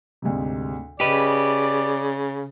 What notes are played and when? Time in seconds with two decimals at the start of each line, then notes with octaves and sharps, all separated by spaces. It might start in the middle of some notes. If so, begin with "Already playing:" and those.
0.22 D2 G#2 C3
1.00 C#3 G4 B4 D5 D#5